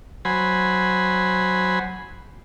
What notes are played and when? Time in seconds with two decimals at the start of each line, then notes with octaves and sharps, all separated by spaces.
0.25 F#3 C5 G#5 B5